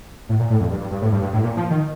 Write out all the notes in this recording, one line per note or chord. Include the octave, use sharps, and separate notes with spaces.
A2
A#2
A2
F2
G2
G2
G2
A2
G2
G2
A2
A#2
F3
D#3